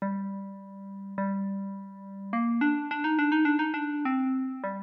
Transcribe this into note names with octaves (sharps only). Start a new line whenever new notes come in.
G3
G3
A#3
D4
D4
D#4
D4
D#4
D4
D#4
D4
C4
G3